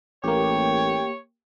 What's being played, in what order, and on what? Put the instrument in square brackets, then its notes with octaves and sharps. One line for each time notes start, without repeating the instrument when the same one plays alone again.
[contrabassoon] A1 [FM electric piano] A#3 G4 [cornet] C#5 [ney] G5